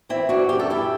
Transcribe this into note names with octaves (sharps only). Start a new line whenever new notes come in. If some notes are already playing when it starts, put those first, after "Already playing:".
E3 C4 E4
D4 F#4
F#2 G4
A4
E4 G4